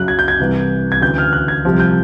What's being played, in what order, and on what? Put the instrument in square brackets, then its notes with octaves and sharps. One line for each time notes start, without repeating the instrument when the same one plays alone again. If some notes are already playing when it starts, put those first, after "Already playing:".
Already playing: [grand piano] F#2 C#3 F#3 F#6
G#6
G6
G#6
C2 C3 E3
G#6
D2 C#3 E3 G6
F6
F#6
G#6
C2 C3 F3
G6